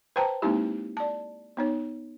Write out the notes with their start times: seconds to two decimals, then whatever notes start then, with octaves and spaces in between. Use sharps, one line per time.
0.16 B4 C5 G5 A5 A#5
0.42 G#3 A#3 C4 D#4 E4 G4
0.97 D5 A5
1.57 B3 D#4 C#5